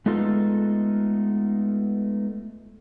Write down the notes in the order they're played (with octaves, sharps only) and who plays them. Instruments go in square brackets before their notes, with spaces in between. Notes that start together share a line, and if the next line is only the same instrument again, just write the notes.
[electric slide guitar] G#3 A3 B3 D#4 F4 A4